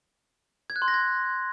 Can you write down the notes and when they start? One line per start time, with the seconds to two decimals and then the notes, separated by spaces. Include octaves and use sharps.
0.70 G#6
0.76 F#6
0.82 C6
0.88 A#6
0.94 G#6